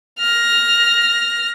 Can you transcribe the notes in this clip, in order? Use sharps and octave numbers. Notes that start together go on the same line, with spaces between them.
F6 A#6